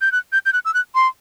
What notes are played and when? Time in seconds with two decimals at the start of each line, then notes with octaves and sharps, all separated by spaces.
0.01 G6
0.12 F#6
0.32 G6
0.46 G6
0.53 F#6
0.65 E6
0.74 F#6
0.95 C6